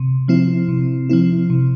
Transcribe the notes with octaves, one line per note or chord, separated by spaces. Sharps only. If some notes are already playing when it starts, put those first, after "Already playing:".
Already playing: C3
F3 C4 E4
C3
F3 C4 E4
C3